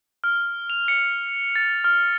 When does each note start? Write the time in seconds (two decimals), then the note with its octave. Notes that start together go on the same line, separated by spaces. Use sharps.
0.24 F6
0.70 F7
0.88 C#7
1.56 A6
1.84 F6